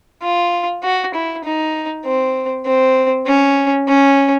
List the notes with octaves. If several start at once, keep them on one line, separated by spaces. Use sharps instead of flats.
F4
F#4
E4
D#4
C4
C4
C#4
C#4